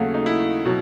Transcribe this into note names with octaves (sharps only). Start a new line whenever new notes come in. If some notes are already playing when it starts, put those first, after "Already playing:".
Already playing: D#2 C#3 F#3 A3 F#4
D#4
E4
B2 F#3